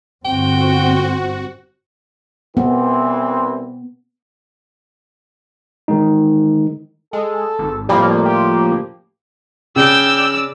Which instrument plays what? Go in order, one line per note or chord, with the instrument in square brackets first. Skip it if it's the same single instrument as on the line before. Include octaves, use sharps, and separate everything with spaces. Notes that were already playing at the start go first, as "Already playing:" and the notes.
[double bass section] G1 C4 [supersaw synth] F#4 [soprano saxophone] G5
[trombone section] C2 E3 C4 [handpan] B3
[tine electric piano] D#3 E3 G#3 D#4
[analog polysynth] G#3 [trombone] A4
[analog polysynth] G#1
[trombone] F2 [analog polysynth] A2 F3 A#3 [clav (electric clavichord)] G3
[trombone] G4
[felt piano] C#3 [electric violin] D5 E6 [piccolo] G5